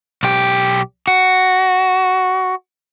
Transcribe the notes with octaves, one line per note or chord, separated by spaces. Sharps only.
B1 G4
F#4